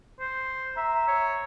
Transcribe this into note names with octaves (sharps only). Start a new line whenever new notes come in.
C5
E5 A#5
C#5